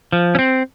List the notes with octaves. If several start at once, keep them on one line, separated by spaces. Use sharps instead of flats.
F3
C#4
C4